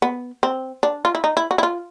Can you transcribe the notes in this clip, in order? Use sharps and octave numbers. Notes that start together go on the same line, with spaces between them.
B3
C4
D4
F4
E4
D#4
E4
F#4
E4
F4